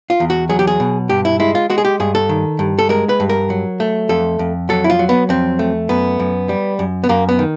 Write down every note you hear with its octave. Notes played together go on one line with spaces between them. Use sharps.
F4
E2
F#4
F#3 G#4
G4
G#4
B2
G2 G4
E4
G#3 E4
F4
G#3 F#4
G#4
G4
G2 G#4
A4
D#3
G2
A4
G#3 A#4
B4
G2
A#4
F#3
A3
F2 A4
F2
F#3 A4
E4
F4
F#3
B3
F2 C4
A3
F#2 B3
F#2
G3
F#2
B3
F#2 A#3
B3
D#3